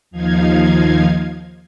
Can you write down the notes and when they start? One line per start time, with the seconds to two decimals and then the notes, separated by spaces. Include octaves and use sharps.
0.11 D#2 F3 D#4 F5 G#6